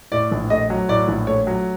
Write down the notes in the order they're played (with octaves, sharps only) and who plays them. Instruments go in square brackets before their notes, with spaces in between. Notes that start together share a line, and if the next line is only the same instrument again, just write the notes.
[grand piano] A2 D5
A#1
A3 D#5
F#3
A2 D5
A#1
A3 C#5
F#3